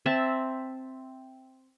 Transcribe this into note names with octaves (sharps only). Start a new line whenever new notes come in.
C4 E5 A5